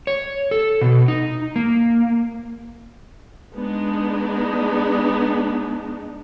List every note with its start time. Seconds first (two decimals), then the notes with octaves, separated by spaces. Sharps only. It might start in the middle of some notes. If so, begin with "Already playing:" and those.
0.07 C#5
0.51 A4
0.81 B2
1.08 D#4
1.56 A#3
3.53 G#3 B3 D4 D#4